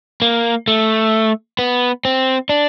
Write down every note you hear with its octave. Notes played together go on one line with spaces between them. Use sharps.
A#3
A3
B3
C4
D4